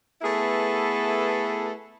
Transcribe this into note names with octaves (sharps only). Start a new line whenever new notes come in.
A3 B3 E4 G#4 A4 B4